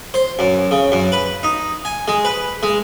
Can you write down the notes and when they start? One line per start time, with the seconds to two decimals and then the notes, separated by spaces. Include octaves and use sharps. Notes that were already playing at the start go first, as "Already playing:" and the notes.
0.14 C5
0.39 F#2
0.71 C#3
0.92 F#2
1.12 B4
1.43 D#4
1.85 G#5
2.08 G#3
2.25 B4
2.63 G#3